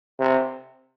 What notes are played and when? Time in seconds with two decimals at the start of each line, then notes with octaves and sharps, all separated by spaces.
0.20 C3